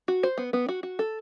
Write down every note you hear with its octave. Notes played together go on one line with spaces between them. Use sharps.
F#4
C5
B3
B3
F#4
F#4
A4